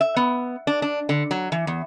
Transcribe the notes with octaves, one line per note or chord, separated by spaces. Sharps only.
E5
B3
D4
D4
D3
F#3
E3
E2